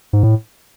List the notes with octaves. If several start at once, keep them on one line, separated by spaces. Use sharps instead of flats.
G#2
A2